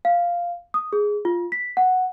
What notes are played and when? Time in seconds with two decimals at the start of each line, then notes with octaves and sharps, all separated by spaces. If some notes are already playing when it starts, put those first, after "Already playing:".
0.05 F5
0.74 D#6
0.93 G#4
1.25 F4
1.52 B6
1.77 F#5